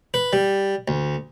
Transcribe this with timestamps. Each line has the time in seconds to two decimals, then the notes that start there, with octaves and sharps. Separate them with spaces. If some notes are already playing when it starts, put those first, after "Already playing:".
0.14 B4
0.33 G3
0.88 D2